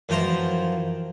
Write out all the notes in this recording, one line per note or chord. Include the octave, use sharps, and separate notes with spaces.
F#2 E3 F3 G5 A#5 C6